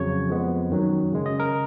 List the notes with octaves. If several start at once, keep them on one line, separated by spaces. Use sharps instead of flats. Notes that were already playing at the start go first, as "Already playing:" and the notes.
Already playing: F2 C#3 F#3 C#5
F2 F3 G#3 B3
F#2 D#3 F#3
C#3 G#3 C#4
D#5
A#4